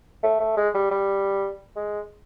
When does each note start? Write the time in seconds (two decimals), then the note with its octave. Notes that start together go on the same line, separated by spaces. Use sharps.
0.23 A3
0.40 A3
0.57 G#3
0.74 G3
0.91 G3
1.76 G#3